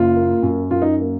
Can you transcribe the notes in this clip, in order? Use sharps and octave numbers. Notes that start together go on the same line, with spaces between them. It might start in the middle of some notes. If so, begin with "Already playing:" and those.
Already playing: F#1 F4
A#3
F#2
F#2 F4
D#4
A#3